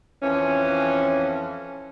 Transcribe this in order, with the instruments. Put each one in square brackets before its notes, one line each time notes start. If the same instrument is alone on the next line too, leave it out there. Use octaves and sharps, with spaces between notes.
[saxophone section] F2 E3 C#4